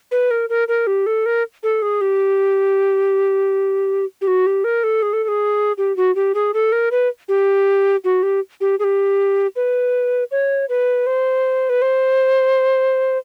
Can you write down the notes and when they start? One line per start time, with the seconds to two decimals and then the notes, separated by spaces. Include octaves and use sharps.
0.11 B4
0.31 A#4
0.50 A#4
0.68 A#4
0.87 G4
1.06 A4
1.26 A#4
1.63 A4
1.82 G#4
2.01 G4
4.21 G4
4.27 F#4
4.46 G4
4.64 A#4
4.84 A4
5.02 G#4
5.13 A4
5.23 A4
5.28 G#4
5.78 G4
5.97 F#4
6.15 G4
6.35 G#4
6.54 A4
6.72 A#4
6.91 B4
7.28 G4
8.04 F#4
8.23 G4
8.61 G4
8.79 G#4
8.84 G4
9.56 B4
10.31 C#5
10.69 B4
11.07 C5
11.69 B4
11.82 C5